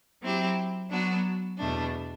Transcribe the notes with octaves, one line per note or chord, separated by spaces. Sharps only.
F#3 C4 E4 G4
F#3 B3 D4 F#4
E2 B2 A3 D4